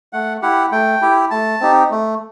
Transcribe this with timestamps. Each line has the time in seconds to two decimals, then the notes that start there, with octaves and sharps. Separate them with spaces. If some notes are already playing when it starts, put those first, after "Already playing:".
0.13 A3 F#5
0.42 E4 G4 F#5
0.72 A3 G5
1.02 E4 G4
1.31 A3 A5
1.61 C4 D#4 G4
1.91 A3